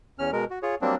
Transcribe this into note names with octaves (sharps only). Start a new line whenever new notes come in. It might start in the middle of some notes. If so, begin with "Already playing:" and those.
E2 C#4 F6
B2 G#3 A#4
F#4
F4 G#4 C#5
F#3 G3 A#3 C4 D4